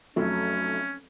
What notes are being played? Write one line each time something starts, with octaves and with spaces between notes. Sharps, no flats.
F1 F#3 A3 C#4